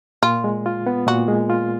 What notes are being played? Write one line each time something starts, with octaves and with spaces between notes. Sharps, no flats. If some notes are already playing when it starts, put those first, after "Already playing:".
A#2 F4
G#3
F4
B3
A#2 F#4
G#3
F4